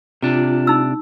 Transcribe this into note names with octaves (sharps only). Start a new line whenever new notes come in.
C3 D4 F4
D#4 E6